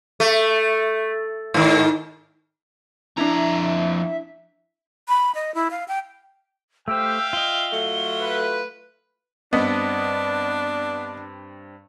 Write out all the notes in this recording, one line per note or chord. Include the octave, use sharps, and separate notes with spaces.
A3
G#2 D#3
F2 D4 E4 E5 A#5
B5
D#5
E4
F5
G5
A3 G4 C5 E5 F5 G5 E6
F4 D#5 G7
F#3 A3
B4
G2 B3 C4 D4 D#5